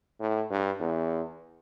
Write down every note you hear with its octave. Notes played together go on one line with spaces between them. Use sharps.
A2
G2
E2